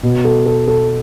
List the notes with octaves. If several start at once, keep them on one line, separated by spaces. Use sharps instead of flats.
B2
A4
A4
A4